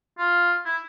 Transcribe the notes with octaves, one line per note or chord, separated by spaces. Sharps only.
F4
E4